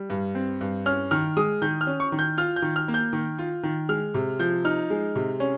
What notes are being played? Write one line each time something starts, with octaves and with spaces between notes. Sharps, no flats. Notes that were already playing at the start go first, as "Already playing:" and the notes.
Already playing: G3
G2
C4
G2
C#4 F6
D#3 F6
G#3 D#6
D#3 G6
F6
C#4
C#6
D#3
G6
F4 F6
G6
D#3
F6
A#3
G6
D#3
F4
D#3
G#3 F6
C3
F3 G6
D#4 F6
G#3
C3
C#4